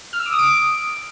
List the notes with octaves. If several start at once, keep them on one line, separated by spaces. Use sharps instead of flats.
F6
E6
D6
D#6
D7